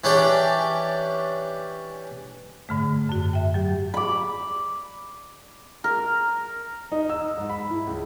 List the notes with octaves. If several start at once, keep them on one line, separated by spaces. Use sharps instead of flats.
E3 C#4 D4 G4 D5
G#2 D3 A3
F#2 F#4
E5 G5
F#3 G4
B5 D6
A#4
D#4
E6
G#2
B5
E4
C#2